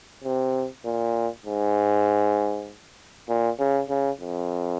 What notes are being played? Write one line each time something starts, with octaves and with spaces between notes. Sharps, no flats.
C3
A#2
G#2
A#2
C#3
C#3
F2